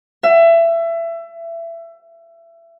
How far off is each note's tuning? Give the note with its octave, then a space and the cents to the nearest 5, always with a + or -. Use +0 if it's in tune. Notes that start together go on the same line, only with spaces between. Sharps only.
E5 +25